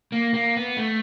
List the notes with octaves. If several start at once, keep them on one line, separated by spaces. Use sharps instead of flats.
A#3
A#3
B3
A3